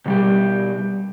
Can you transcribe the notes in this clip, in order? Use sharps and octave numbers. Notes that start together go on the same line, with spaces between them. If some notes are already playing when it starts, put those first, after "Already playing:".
B2 G3 G4